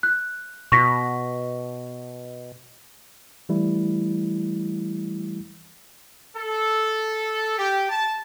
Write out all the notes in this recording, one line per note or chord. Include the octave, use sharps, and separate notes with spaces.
F#6
B2 C#6 A#6 B6
E3 G3 A3 E4
A4
G4
A5